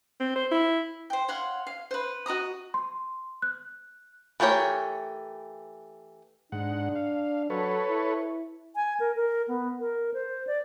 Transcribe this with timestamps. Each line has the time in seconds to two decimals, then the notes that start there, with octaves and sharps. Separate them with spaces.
0.20 C4
0.36 C5
0.52 E4
1.10 C5 G5
1.28 C#5 F5 F#5 C6
1.67 F5
1.91 B4 C5
2.26 F#4 D#5 A#5 D#6
2.74 C6
3.42 F#6
4.40 E3 A3 G4 A#4 C#5
6.52 G#2 D4 F#5
6.95 F5
7.50 F#3 A4 B4 C#5
7.89 E4
8.75 G#5
9.00 A#4
9.16 A#4
9.48 B3
9.80 A#4
10.14 C5
10.47 D5